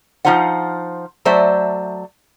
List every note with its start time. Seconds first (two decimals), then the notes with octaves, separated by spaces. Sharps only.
0.25 F3 A3 D#4 F4 C5 F#5
1.25 F#3 A3 C5 D5 E5